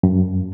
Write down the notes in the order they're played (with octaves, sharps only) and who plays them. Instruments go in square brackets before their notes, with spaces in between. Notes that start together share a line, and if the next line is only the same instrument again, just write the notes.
[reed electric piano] F#2